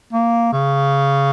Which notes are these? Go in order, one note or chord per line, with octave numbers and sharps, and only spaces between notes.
A#3
C#3